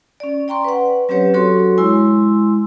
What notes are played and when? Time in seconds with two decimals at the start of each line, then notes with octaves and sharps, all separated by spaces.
0.20 C#4 D5
0.48 D5 G5 A#5 C6 C#6
0.65 B4 F#5
1.09 F#3 C4 C#4 G4 B4 C#5
1.34 F#3 F#4 A4 C#5 C6 C#6
1.78 G#3 E4 G#5 C6 E6